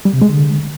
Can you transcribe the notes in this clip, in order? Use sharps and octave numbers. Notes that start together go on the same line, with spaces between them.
G3
C3
G#3
D3